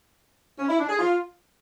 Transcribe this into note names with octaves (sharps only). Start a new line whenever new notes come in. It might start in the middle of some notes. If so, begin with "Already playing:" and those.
C#4
E4
D4
G#4
F4